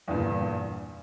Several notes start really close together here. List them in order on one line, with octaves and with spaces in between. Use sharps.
E2 G2 A#2 D3